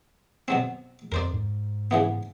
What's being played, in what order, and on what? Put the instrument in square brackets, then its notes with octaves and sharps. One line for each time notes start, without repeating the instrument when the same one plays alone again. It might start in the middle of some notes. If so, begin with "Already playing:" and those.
[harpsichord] B2 F#3 C4
[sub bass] F2 [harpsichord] A#4 C5 D5
[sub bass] G#2
[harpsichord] C#3 E3 B3